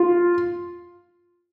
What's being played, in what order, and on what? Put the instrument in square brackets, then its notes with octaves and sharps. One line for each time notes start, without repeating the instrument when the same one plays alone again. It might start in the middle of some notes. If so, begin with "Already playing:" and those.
Already playing: [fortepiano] F4